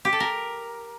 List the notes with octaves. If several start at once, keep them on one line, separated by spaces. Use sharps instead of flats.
G4
A4
A#4